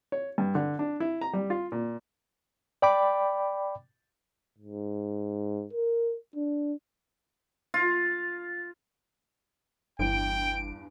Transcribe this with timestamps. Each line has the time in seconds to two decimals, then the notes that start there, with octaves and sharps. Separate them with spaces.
0.12 C#5
0.38 G2
0.55 D3
0.79 D4
1.00 E4
1.21 A#5
1.33 G3
1.50 F4
1.72 A#2
2.82 D5 G5 B5 D6
4.58 G#2
5.73 A#4
6.35 D4
7.74 F4
9.99 G1 E2 G2 E3 G5 D7